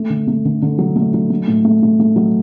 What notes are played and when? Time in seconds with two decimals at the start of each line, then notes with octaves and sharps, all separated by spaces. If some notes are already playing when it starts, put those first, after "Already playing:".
Already playing: A3
0.10 D3
0.27 A3
0.45 D3
0.62 D3
0.78 F#3
0.96 A3
1.14 F#3
1.30 A3
1.48 A2
1.65 A3
1.83 A3
1.99 A3
2.16 F#3